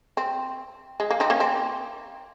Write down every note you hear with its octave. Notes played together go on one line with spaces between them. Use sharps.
C4
G#3
A#3
C4 D#4
A#3 C#4
C4